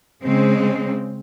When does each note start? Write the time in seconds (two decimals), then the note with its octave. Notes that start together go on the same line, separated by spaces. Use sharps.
0.23 C#3 G#3 C4